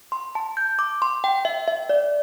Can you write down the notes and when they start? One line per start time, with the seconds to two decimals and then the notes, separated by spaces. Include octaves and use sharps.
0.12 C6
0.35 A5
0.57 G6
0.79 D6
1.02 C6
1.24 G5
1.45 E5
1.68 E5
1.89 D5